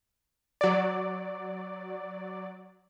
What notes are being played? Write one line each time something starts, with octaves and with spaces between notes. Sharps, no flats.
F#3 D5